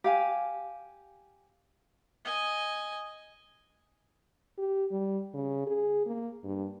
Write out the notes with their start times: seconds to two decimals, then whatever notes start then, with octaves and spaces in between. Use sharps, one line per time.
0.04 G4 F5 G#5
2.25 D#5 G#5
4.58 G4
4.91 G3
5.34 C#3
5.67 G#4
6.06 A#3
6.44 G2